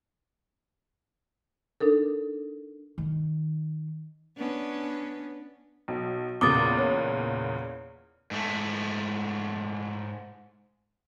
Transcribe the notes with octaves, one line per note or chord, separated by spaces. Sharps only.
D4 D#4 A4 A#4
D#3
B3 C#4 D4
B1
E2 A#2 C#3 D6 D#6 A6
C#5
G#2 A3